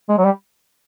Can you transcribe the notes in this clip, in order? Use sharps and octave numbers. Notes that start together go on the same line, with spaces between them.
G#3
F#3
G3